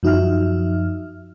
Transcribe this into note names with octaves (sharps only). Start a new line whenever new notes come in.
F#2 F3 D#4 F#4 E5 F6